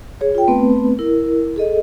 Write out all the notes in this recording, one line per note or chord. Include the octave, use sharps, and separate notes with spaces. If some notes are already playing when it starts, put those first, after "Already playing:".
G#4 C#5
F4 G5
A3 B3 C4 B4
E4 A#4
G#4 A4 D#5